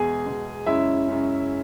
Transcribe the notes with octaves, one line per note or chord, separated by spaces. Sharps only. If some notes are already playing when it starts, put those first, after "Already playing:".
Already playing: E2 B2 G#3 G#4 G#5
E2 B2 G#3
F#2 C#3 G#3 C#4 E4 E5
F#2 C#3 G#3 C#4